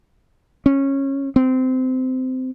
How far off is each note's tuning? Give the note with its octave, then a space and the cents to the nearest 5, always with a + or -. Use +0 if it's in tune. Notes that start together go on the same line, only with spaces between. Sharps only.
C#4 -15
C4 -20